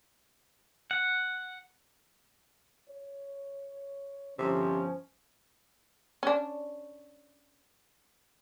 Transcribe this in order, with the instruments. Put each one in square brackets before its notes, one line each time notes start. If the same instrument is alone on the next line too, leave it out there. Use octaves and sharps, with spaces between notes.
[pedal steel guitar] F#5
[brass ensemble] C#5
[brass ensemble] G1 [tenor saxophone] C3 [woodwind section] F3 [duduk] C#4
[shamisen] C#4 D4